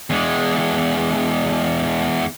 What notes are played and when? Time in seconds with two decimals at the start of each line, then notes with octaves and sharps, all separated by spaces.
0.10 E2 G#3